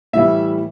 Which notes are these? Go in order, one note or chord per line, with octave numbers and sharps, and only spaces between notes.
A2 E3 G3 E5